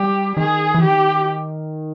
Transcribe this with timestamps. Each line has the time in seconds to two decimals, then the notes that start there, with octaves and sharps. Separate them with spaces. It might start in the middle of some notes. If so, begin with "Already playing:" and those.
Already playing: G3 G4
0.37 D#3 G#4
0.74 E3
0.83 D#3 G4